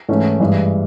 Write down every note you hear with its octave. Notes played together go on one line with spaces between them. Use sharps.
G#2 E3 A3 C#4
G2 E3 G#3